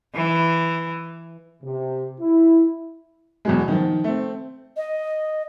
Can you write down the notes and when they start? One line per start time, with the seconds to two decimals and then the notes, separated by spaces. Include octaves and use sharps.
0.15 E3
1.63 C3
2.20 E4
3.45 E2 B2 F#3 G#3
3.68 D#3 F3
4.04 A3 C4
4.77 D#5